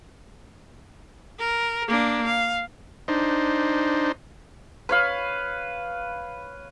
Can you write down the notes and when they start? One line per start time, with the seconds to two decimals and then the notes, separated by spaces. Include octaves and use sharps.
1.39 A#4
1.88 A#3 D4
2.27 F5
3.08 D4 D#4 C5
4.89 B4 C#5 F5